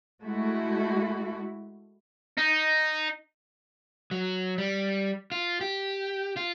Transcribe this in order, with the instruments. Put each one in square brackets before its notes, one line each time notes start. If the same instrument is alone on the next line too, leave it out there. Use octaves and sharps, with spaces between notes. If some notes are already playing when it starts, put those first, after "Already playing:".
[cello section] G#3 A3 E4 F#4
[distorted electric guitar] D#4
[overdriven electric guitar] F#3
G3
F4
G4
F4